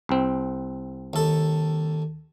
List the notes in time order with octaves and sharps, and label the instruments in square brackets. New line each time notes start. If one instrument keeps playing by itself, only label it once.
[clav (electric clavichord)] C2 C4
[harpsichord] D#2 A4